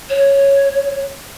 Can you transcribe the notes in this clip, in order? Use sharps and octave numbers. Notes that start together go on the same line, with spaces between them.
C#5